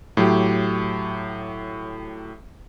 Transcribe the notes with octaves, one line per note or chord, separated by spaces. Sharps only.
A2 F#3 G4